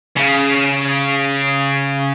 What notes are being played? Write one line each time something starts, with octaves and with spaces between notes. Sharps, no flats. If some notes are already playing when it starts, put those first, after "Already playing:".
C#3